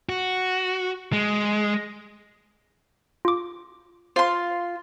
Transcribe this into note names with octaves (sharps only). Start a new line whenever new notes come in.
F#4
G#3
F4 D6
F4 C5 C6